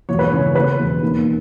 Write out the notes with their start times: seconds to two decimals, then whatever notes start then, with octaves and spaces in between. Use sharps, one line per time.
0.09 E1 C#5
0.19 B4
0.30 C#3 C#5
0.55 C#3 B4
0.79 E1
1.02 D#2